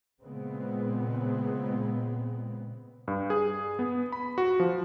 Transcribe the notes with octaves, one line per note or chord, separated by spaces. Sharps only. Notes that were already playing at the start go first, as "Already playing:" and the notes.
A#2 C#3 G#3 B3 C4
G2
G#4
B3
B5
F#4
F3